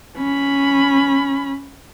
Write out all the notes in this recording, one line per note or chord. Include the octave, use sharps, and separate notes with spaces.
C#4 B5